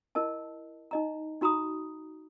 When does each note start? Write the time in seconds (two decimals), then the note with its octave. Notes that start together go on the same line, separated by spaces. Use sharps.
0.15 E4 A#4 D#5 A5
0.91 D#4 D#5 A#5
1.41 D#4 F#4 A#5 B5 D#6